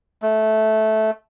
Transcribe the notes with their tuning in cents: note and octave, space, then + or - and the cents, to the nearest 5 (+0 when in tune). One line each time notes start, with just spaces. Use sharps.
A3 -15